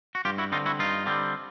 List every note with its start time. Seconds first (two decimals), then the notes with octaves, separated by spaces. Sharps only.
0.15 F#4
0.25 G2 F4 G4
0.38 E4 F#4
0.52 D3 G3 C4 D#4 F4
0.66 E4 F#4
0.79 G2 D#4 F4
1.06 D3 G3 C4